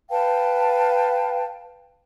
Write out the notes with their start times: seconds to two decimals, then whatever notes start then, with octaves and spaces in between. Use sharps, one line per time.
0.10 B4 F5 G5 A5